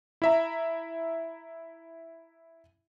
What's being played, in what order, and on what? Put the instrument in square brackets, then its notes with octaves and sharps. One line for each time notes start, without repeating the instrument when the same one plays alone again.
[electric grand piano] E4 E5 A#5